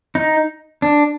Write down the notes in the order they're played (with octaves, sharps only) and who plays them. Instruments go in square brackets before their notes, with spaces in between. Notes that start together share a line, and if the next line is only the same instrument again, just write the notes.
[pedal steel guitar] D#4
D4